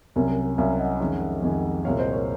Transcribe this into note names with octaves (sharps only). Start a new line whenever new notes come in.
C2 C3 F#3 C#4 A#4 C#5
C2 C3 F#3 C#4 C#5 F5
G#5
D#5 F#5
F2 D#3 G#3 C#4
F2 D#3 G#3 C#4
C2 A#2 G#3 C#5 F5
C5 D#5
A#4 C#5